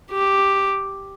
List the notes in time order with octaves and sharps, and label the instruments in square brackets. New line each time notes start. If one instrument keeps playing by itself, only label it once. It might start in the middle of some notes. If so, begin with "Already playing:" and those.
[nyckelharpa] G4